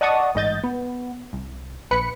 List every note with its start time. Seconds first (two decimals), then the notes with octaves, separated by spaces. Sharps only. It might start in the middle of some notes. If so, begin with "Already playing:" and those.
0.01 D5 D#5 F#5 A5 C#6 D#6
0.35 A1 G#2 D#5 G6 A6
0.64 B3
1.33 C2
1.91 A#1 B4 B5 C#7